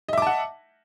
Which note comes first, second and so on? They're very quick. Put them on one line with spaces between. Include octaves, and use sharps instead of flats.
D#5 E5 D6 A5 F#5